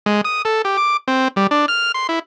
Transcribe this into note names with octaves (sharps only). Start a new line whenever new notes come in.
G#3
D#6
A4
G4
D6
C4
G3
D4
F6
C6
E4